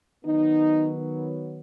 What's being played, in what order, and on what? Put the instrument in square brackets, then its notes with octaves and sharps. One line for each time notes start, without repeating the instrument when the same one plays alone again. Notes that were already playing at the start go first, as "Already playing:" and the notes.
[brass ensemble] D#3 F#3 B3 D#4